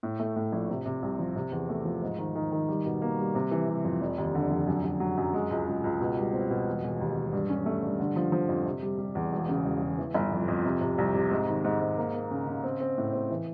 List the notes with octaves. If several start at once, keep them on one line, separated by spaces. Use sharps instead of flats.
A2
A3
A2
A#1
C3
C3
C2
F3
C3
E2
A3
F3
G#2
D#3
D#3
D#3
G3
B2
A#3
G3
C3
E3
C3
F2
F1
D#2
D3
F1
F#2
F#2
F#3
F#2
G#3
C#2
C#2
C#2
B2
G3
C4
B2
E1
E1
D#2
E1
G2
C#4
A3
G2
D3
F3
F3
F2
C3
G3
G3
E2
E1
C#3
E1
E1
E3
G1
F2
F2
C3
C3
C2
C3
G#2
D#3
G#2
G#2
A#3
A#3
C#3
C#3
C4
C4
A2
C4
E3